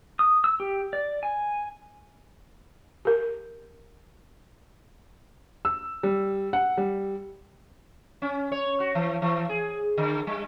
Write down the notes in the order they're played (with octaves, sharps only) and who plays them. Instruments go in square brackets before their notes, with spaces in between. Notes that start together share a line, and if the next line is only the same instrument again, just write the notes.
[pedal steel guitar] D#6
E6
G4
D5
G#5
[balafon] G4 A#4
[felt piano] E6
G3
F#5
G3
[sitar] C#4
C#5
F#4
E3
E3
G#4
D3
G3